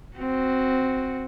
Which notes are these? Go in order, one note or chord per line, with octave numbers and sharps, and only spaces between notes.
C4 F#4